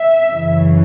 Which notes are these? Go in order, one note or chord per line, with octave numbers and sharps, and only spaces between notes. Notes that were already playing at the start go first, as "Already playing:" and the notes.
Already playing: E5
F#2 C#3 E3